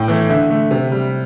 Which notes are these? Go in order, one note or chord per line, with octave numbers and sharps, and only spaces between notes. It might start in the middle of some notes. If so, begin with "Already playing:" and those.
Already playing: A2 G5
E3 A3
D3 E5
A3
C3
G3